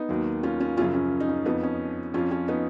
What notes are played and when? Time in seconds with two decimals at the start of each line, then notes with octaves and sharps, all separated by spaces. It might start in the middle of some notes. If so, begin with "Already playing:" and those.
Already playing: B3 D#4
0.09 D#2 D#3 F#3
0.43 C#4 F4
0.60 C#4 F4
0.77 F#2 C#3 F3 C#4 F4
0.94 C#4
1.20 D#4
1.29 C#4
1.45 F2 F3 B3 D#4
1.63 C#4
2.14 F2 F3 C#4 F4
2.31 C#4 F4
2.48 B3 D#4